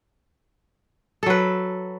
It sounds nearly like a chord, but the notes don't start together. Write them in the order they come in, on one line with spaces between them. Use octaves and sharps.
A4 F#3 B4